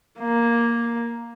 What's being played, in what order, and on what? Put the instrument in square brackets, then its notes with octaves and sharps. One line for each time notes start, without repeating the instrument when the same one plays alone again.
[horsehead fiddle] A#3